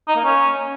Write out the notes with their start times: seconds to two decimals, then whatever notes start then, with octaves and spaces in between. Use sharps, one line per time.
0.08 D#4
0.16 A#3
0.24 C#4